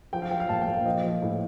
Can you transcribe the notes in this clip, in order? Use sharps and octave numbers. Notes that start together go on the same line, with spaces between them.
F3 G5
F5
F3 G5
F5
A#2 A5
G5
A#2
F5
F3 D#5
F3
A2